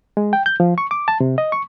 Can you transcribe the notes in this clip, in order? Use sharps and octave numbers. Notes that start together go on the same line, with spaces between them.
G#3
G5
G6
F3
C#6
D6
A5
C3
D#5
C#6